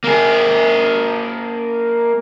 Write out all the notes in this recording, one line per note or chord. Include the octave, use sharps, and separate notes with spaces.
A#3 G#4